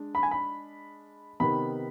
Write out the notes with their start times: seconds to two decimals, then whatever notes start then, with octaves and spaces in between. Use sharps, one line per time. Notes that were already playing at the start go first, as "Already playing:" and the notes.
Already playing: G#3 D4
0.15 B5
0.23 G#5
0.31 B5
1.40 C3 D#3 B3 B5